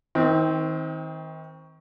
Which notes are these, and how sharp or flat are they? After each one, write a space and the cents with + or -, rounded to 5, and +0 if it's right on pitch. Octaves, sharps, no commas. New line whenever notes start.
D#3 +35 C4 +0